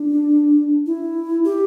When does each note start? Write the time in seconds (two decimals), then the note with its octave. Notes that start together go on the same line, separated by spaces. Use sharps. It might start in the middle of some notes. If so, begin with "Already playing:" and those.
Already playing: D4
0.86 E4
1.45 G4